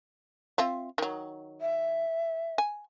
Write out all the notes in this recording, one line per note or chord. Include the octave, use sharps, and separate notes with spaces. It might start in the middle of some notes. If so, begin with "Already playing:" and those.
C4 F4 E5
D#3 F#3
E5
G#5